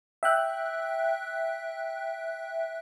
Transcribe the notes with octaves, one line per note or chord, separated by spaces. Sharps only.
E5 G5 F#6